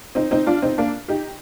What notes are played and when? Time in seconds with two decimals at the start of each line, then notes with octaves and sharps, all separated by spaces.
0.15 C4 D#4
0.31 C4 D#4
0.46 D4 F4
0.62 C4 D#4
0.78 A#3 D4
1.08 D#4 G4